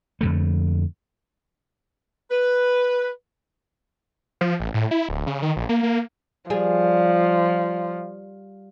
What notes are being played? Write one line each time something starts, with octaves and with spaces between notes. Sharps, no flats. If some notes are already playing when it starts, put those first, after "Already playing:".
F2 D3 A3
B4
F3
A1
A2
E4
D1
C#3
D#3
A#1
A#3
A#3
F3 G3 G#4